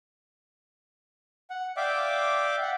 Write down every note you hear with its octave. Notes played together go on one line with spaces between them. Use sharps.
F#5
D5 E5 F5 G5 D6
F#5